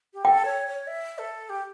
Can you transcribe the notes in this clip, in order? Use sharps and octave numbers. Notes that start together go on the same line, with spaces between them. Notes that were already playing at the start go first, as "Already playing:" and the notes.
G4
A4 G5
C#5
C#5
E5
A4
G4